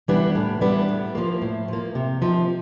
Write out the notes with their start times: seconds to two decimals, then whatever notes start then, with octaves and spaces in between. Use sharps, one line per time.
0.08 E3 G3 B3 D4
0.35 A2
0.61 E3 G3 B3 D4
0.89 A2
1.15 F3 A#3
1.42 A2
1.68 F3 A#3
1.95 C3
2.22 F3 A#3 D#4